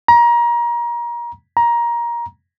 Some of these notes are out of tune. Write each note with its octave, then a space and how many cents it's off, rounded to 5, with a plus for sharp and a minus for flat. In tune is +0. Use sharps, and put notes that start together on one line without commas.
A#5 +30
A#5 +20